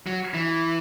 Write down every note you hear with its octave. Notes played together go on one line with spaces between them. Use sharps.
F#3
E3